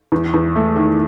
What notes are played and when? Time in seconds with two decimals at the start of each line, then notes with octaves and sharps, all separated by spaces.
0.12 E2
0.34 E2
0.56 A3
0.76 D#3